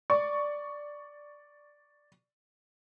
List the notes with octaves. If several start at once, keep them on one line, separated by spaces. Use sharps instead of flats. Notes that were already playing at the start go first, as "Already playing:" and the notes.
D5 C#6